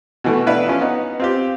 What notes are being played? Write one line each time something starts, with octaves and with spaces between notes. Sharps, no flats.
B2 E3 A3
B3 D4 E4 B4 E5 F5
F3 C#4
B3 D#4
C4 F4 G4